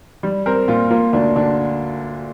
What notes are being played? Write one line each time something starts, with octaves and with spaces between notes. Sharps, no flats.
G3
C4 A#4
A#2 F4
A#3 F4
D2 D4
D3 D4